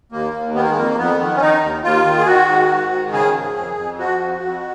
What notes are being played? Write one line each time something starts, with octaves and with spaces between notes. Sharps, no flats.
D#2 A#3
D#2
D#3 B3
A#3
G#3
F2 A#3
F2 B3
D#3
C#4
D#3 D#4
D#2
D#2 F4
D#3
G#4
D#3 F#4
G#2
G#2
D#3
C#3 G#4
F3
F2
F2
F3 F#4
F2
F2